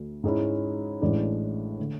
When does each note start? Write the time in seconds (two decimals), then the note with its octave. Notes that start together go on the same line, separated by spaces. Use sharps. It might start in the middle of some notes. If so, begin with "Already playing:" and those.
Already playing: D2 D3 A3 D4
0.24 G#2 G#3 C#4 E4
1.01 A1 A2 G#3 D4
1.79 D3 A3